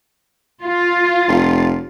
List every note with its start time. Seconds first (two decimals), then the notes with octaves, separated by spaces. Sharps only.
0.62 F4
1.28 F1